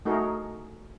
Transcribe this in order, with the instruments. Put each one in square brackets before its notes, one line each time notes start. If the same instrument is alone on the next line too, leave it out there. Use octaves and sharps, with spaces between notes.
[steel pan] A3 D#4 F#4 G#4 A#4